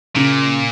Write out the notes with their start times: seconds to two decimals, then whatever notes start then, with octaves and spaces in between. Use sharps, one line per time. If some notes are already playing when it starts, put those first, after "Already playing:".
0.16 A#2 C#3